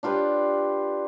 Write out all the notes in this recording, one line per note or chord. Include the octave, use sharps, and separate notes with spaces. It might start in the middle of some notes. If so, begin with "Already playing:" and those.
D4 F4 G4 B4